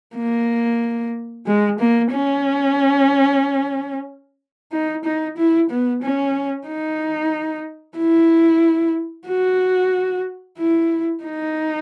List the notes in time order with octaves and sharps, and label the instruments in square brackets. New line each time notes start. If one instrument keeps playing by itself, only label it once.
[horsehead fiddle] A#3
G#3
A#3
C#4
D#4
D#4
E4
B3
C#4
D#4
E4
F#4
E4
D#4